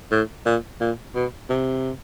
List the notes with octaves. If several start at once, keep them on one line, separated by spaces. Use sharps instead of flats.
A2
A#2
A#2
B2
C3